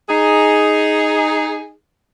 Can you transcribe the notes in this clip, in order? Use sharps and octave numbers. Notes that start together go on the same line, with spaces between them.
D#4 G#4